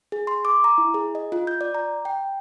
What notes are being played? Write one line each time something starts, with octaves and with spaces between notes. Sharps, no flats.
G#4
C6
D6
A#5
E4
G#4
D#5
F4
G6
D5
A#5
G5